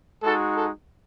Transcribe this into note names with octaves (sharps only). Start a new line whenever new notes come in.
G#3 D#4 F#4 A4
A4